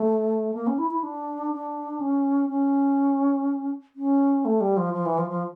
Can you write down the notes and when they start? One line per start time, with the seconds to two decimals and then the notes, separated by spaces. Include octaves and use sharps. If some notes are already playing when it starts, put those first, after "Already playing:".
Already playing: A3
0.54 A#3
0.67 C#4
0.78 E4
0.91 E4
1.03 D4
1.52 D4
2.00 C#4
2.50 C#4
3.96 C#4
4.45 A3
4.61 G3
4.77 F3
4.94 F3
5.06 E3
5.18 F3
5.30 F3